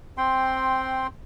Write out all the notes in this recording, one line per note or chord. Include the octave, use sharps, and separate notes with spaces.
C4 G5 C6